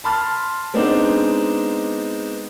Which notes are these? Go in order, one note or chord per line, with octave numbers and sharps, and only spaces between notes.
A5 B5 C6 F6 A6
G#3 B3 C4 D4 D#4